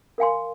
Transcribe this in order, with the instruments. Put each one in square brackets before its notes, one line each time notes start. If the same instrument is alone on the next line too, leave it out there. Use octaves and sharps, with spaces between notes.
[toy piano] A#4 F5 G#5 C6